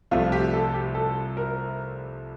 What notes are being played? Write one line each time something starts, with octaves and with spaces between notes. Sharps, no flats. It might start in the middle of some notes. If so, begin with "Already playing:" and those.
C2 C3 F3 A3 F4
G4
A4
G4
A4
A#4